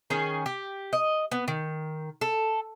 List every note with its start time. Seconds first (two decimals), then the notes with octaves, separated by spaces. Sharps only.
0.10 D#3 C#4 G#4
0.46 G4
0.93 D#5
1.31 B3
1.48 D#3
2.21 A4